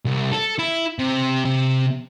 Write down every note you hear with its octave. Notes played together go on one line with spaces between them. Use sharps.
C2
A4
E4
C3
C3